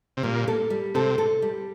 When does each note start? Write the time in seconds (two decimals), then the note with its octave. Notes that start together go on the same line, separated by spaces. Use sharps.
0.17 C3
0.23 A#2 G3
0.48 A4
0.70 G3
0.94 C3 A4
1.18 A4
1.42 G3